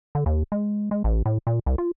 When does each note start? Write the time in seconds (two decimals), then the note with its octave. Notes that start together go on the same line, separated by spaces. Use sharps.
0.15 D3
0.26 D#2
0.52 G#3
0.91 G#3
1.04 A1
1.26 A2
1.47 A#2
1.66 C2
1.78 F4